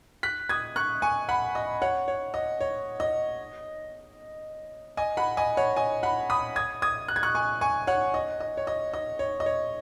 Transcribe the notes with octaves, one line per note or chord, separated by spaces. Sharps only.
F#6 B6
D#6 G#6
C#6 F#6
G#5 C#6
F#5 B5
D#5
C#5 F#5
C#5
D#5
C#5
D#5
D#5 G#5
F#5 B5
D#5 G#5
C#5 F#5
D#5 G#5
F#5 B5
B5 D#6
D#6 G#6
D#6 G#6
F#6
G#6
C#6 F#6
G#5 C#6
G#5 C#6
C#5 F#5
D#5
D#5
C#5
D#5
D#5
C#5
D#5
C#5